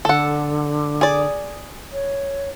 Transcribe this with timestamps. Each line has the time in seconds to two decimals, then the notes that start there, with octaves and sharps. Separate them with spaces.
0.05 D3 A4 F#5
1.01 G#4 D5
1.93 C#5